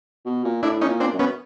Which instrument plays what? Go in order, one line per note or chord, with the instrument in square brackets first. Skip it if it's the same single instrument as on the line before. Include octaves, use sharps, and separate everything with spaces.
[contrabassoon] B2
A#2
[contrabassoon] A2 [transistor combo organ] D4 E4
[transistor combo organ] C#4 D#4
[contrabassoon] A#2
[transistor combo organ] C4 D4
[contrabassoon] F#2
[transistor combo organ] B3 C#4